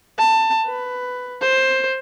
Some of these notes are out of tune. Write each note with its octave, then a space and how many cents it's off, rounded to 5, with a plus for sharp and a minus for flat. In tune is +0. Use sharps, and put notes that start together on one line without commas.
A5 +20
B4 +10
C5 +10